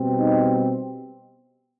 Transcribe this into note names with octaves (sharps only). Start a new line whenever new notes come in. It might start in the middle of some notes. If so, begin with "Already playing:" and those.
Already playing: B2 G3 C4
D#4